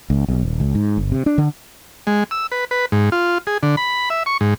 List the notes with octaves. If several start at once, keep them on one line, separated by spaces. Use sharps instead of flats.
C#2
B1
D#1
C#2
G#2
G1
C3
D4
D3
G#3
E6
B4
B4
G#2
F4
G#4
D3
B5
E5
C#6
G#2